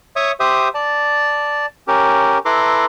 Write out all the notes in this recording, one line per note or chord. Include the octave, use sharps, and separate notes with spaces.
C#5 E5 C#6 D#6
G4 C5 E5 D#6
D5 A5
C#4 G4 A#4
E4 A4 B4 A#5 C6 D6